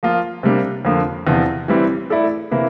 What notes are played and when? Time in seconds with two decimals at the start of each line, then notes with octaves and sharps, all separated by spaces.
0.03 F3 A#3 F4
0.43 C3 G3 A#3 D4
0.85 F2 D3 F3 A#3
1.27 E2 C3 F3
1.68 E3 G3 C4 E4
2.10 A3 E4 A4 D5
2.51 C3 E3 A#3 E4